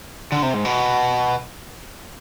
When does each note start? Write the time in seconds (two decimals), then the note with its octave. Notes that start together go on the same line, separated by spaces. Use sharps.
0.32 D3
0.43 C3
0.54 G#2
0.65 B2